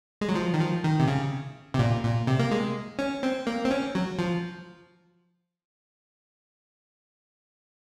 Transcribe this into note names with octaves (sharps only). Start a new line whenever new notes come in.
G#3
F#3
F3
D#3
F3
D#3
C3
C#3
C3
A#2
A#2
C3
A#3
G#3
C#4
C4
A#3
C4
C#4
F#3
F3